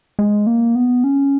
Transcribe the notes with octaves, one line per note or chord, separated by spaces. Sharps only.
G#3
A#3
B3
C#4